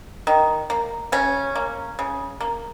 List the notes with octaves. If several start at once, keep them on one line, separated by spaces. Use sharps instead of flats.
D#3
A#3
C#3 C#4
A#3
C#3
A#3